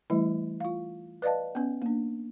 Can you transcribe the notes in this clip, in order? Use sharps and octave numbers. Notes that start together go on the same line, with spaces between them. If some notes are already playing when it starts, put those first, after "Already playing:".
E3 G3 A3 E4
F4 F5
B4 D5 D#5 F5 A5
B3 C#4
A#3 D4